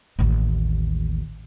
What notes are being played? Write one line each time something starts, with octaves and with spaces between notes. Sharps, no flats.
A1 D#2